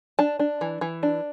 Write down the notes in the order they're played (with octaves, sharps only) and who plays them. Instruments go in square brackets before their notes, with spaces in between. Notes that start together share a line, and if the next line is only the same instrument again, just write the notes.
[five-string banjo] D4 A5
D4
E3
E3
D4